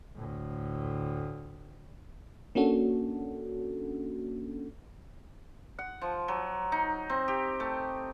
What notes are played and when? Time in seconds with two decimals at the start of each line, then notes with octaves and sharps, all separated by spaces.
0.15 D2 A2
2.55 A#3 C#4 D4 F#4 A4
5.79 F#5
6.01 F3
6.28 F#3
6.72 D#4
7.10 C4
7.28 G4
7.60 A3